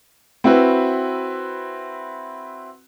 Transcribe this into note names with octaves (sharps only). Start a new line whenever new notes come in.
C4 E4 F#4 B4